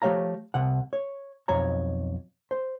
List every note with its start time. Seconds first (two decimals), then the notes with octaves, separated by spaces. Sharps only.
0.02 F3 A3 G4 C#5 F5 A#5
0.54 C2 C3 F#5
0.93 C#5
1.48 B1 F2 C#5 A#5
2.51 C5